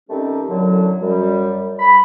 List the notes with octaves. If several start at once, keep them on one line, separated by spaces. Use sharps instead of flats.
D#3 G3 A3 C4 C#4 G4
F#2 A2 D3 F#3
F#2 G3
B5